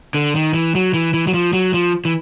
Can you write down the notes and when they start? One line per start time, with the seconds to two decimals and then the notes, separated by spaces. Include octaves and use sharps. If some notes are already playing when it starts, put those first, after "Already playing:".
0.14 D3
0.35 D#3
0.54 E3
0.75 F#3
0.94 E3
1.14 E3
1.27 F#3
1.34 F3
1.53 F#3
1.74 F3
2.05 E3